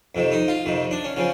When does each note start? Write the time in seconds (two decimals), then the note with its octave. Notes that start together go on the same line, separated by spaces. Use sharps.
0.15 F2 C3 D#3
0.32 D#4
0.48 F4
0.66 F2 C3 D#3
0.91 D4
1.04 C#4
1.16 C#3 F3 C#4